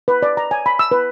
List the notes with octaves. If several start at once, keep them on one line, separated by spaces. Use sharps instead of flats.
B4
D5
A#5
G#5
B5
E6
B4